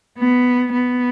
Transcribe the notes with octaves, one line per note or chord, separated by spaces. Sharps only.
B3
B3